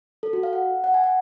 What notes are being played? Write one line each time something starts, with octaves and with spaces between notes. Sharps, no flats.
A4
F#4
F5
F#5
F#5
G#5
F#5